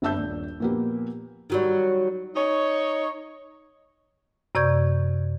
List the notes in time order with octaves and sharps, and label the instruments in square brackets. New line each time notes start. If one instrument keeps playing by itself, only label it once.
[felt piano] G1 G2 E5 A5 E6 G6
D#1 D4
A#2 F3 A#3 B3 G4
[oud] D#3 F#3 G3
[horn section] D#4 C#5
[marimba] F#2 C3 D5 C#6 G6 G#6